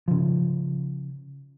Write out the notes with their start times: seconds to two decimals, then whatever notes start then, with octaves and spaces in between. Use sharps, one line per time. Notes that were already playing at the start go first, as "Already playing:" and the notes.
0.08 C#3 F3